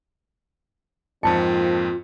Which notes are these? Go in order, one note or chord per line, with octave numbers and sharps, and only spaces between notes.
F2 G#2 F3 A#3 C4 F4 A5 C#7